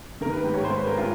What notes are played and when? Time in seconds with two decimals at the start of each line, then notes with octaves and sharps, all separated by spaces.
0.21 D#3 A#4
0.32 B4
0.44 G#2 G4
0.54 C#5
0.64 G#2 C5
0.77 B4
0.86 G#3 A#4
0.98 F4